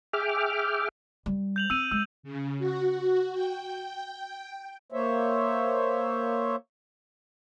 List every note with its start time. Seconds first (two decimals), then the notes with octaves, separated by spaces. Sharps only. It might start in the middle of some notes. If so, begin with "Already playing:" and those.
0.13 G#4 E5 G5 D6 F6
1.26 G3
1.56 G6 F7 F#7
1.70 C4 E6 D#7
1.91 G#3 E6
2.23 C#3
2.58 F#4
3.32 G5
4.92 A#3 C5 C#5 E5